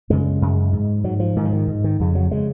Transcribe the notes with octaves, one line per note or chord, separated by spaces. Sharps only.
F#2 C#3 G#3
F#2 C#3
G#2
G#2 F#3
F3
G#2 D#3
F3
D#3
G#2
D#3
F2 C#3
F#3
C#3 G#3